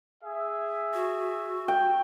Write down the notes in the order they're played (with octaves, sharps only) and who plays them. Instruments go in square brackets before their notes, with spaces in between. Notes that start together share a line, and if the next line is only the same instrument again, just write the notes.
[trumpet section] G#4 E5
[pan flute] F#4
[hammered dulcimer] G5